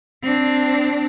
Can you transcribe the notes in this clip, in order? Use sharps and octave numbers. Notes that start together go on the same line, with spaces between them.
C4 D4